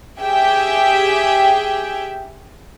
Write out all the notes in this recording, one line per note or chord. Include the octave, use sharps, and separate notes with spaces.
G4 G#4 E5 G5